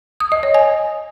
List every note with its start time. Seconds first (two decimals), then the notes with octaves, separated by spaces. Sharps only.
0.20 D#6
0.32 D#5
0.43 C#5
0.54 G#5